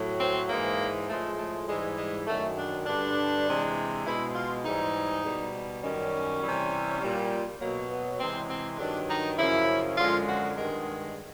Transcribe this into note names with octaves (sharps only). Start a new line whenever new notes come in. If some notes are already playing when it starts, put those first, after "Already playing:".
Already playing: A2 F#3
C4
G#2 E3 G#3 A#3
A2 F3 G#3 A3
A3
G#2 E3 G3 G#3
G#3
F#2 D#3 F#3 A3
D4
G2 D3 G3 D4
C3 E3 G#3
B2 G#3 E4
F4
G#2 E3 G3 D#4
B2 G3
F#2 D#3 G3 C#4
C3 E3 G3
A#2 G3
B2 F#3 A#3
B3
C3 E3 G#3 C4
C4
G2 D#3 F#3 D4
D#4
F#2 C#3 F3 E4
F#2 D3 F3 G#3 F4
F#4
G2 D#3 G#3 A#4